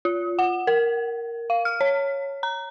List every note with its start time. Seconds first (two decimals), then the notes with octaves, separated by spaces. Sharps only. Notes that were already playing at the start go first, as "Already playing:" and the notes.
0.05 F4
0.39 F#5
0.67 A#4
1.50 F5
1.65 F6
1.81 C#5
2.43 A#5